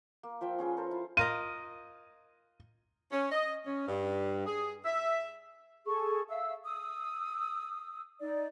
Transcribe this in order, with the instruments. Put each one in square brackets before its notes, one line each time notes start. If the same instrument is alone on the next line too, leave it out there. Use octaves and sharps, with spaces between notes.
[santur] A#3
F3 F4 E5 G5
C#4 F4 G#4 B4
A4 A#4 C5
E4
[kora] F4 A#4 D#5 [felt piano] D#7
[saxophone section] C#4
D#5
C#4
G2
G#4
E5
[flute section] G#4 A4 C#6
E5 F5 E6
D#6 E6
D#4 D5